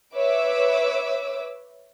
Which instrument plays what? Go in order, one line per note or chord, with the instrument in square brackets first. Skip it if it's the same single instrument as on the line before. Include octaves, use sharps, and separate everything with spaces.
[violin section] B4 C#5 E5 D6 E6